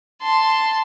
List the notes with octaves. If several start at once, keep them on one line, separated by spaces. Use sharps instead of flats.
A5 C6